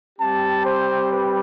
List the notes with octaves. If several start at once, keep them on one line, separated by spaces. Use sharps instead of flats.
G3 C4 G4 A5
C5
B4